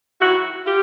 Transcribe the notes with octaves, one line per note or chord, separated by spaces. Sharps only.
D#3 F#3 E4 F#4
F4 G4